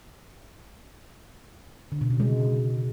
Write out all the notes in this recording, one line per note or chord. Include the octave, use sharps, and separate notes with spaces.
D3
B2
C#3
G#3